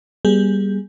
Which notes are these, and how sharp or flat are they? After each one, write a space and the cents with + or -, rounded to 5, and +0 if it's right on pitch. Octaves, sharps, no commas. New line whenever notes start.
G3 +0 B3 -45 G#4 +0